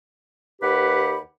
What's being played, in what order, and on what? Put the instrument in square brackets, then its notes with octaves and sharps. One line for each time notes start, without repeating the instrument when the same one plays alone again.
[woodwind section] D#2 G4 B4 F#5 B5